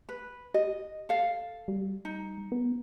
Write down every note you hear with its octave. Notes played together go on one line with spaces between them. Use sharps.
B4
G4 D#5
A4 F5
G3
D#4
B3